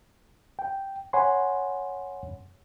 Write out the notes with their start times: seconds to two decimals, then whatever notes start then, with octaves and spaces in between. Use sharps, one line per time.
0.59 G5
1.13 C#5 F#5 G#5 B5 C6